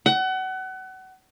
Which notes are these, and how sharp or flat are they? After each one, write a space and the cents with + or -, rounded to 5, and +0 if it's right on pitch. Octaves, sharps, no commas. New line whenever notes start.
F#5 +30